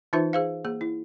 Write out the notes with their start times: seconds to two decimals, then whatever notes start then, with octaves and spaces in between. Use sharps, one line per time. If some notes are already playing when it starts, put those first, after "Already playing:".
0.13 E3 D#4 F4 B4 C5 E5
0.33 G#4 C5 F5
0.65 A#3 G#4
0.81 E4